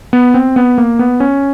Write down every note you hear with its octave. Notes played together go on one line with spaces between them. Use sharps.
B3
C4
B3
A#3
B3
C#4